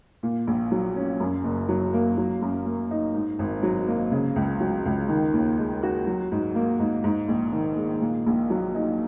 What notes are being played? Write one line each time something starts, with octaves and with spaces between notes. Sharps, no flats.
A#2
A#1
F#3
C#4
F#2
F#1
F#3
A#3
F#3
F#2
A#3
D#4
G#2
G#1
F#3
A#3
C#3
C#2
F#3
C#2
D#3
D#2
G#3
F#4
F#3
G#2
A#3
G#2
G#2
A#1
D#3
G#3
A#2
A#1
F#3
D#4